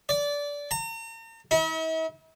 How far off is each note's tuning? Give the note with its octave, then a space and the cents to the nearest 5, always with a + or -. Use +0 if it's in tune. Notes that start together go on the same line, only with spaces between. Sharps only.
D5 -20
A#5 -45
E4 -45